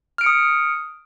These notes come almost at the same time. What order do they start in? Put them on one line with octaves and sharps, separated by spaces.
F6 D7 C#7 D#6